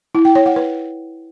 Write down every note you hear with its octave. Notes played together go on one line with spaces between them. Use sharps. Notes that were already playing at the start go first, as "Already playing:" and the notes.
E4
G5
C#5
F#5
B4